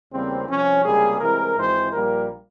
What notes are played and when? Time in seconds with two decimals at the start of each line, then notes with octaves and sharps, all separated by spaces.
0.12 E2 C#3 G3 A#3 C4
0.48 C2 C3 F3 C#4
0.84 C#2 C3 G3 A#3 G#4
1.20 C2 C3 E3 G#3 A#4
1.56 G#1 G#2 E3 G#3 C4 C5
1.92 A#1 A#2 G3 A#3 A#4